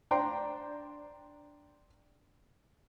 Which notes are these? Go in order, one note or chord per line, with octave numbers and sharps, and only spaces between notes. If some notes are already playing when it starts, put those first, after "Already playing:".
D4 C5 G5 A#5 C6